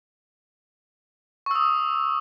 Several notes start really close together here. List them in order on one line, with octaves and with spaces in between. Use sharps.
C#6 E6 D#6